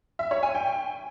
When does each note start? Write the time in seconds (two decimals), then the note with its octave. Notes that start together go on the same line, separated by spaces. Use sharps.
0.19 E5
0.31 C#5
0.43 G#5
0.55 G5